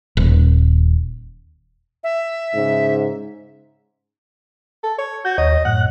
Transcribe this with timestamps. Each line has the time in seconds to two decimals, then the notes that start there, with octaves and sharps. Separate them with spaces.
0.17 D#1
2.04 E5
2.55 G#2 C#3
4.84 A4
4.98 C#5
5.25 F#4 G6
5.38 D#2 C#5 D#5
5.65 F#2 A2 F#5 F#6